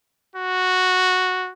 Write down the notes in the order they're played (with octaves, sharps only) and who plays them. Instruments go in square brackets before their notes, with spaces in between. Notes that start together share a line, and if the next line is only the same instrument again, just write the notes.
[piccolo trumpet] F#4